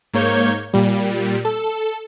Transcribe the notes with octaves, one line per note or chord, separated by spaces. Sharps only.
G#2 A#3 C#5 G6 G#6
A#2 G3
A4